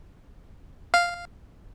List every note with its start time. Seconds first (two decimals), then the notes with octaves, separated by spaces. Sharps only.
0.94 F5